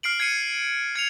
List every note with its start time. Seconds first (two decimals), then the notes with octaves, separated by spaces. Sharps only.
0.03 F6 C7 D7 F#7
0.20 G#6 C7 C#7 D#7
0.95 G#6 C#7 F7